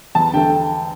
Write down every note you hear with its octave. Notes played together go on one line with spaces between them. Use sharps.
E2 A5
D3 A3 G5